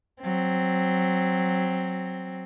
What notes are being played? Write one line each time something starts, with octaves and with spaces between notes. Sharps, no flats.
F#3 C4